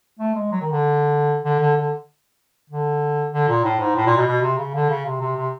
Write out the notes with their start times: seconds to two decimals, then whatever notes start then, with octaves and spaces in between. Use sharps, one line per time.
0.19 A3
0.35 G#3
0.51 F#3
0.61 D#3
0.72 D3
1.45 D3
1.60 D3
1.76 D3
2.70 D3
3.32 D3
3.48 A#2
3.64 A2
3.80 G#2
3.95 A2
4.06 A#2
4.17 B2
4.27 B2
4.42 C3
4.58 C#3
4.74 D3
4.90 C#3
5.05 C3
5.21 C3
5.36 C3